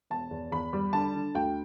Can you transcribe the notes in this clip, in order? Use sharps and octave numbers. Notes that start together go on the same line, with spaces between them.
E1 A5
E2
E2 B5
G3
D3 A5
D3
D2 G5